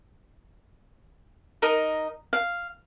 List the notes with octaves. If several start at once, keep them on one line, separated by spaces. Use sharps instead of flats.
D#4 A#4 D#5 D#6
F5